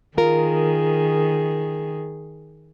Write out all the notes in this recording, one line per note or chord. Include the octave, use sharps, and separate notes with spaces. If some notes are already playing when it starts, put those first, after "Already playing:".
D#3 F4 G#4 A#4